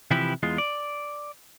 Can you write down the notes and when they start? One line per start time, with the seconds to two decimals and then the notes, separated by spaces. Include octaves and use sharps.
0.11 C3 E3 F3 E4 G4 B4
0.43 E2 G#3 F4
0.58 D5